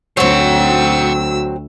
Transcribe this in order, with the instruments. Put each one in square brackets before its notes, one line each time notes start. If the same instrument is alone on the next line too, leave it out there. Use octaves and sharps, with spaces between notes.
[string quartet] D2 E6 [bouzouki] F#3 C4 [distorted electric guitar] C5 F#5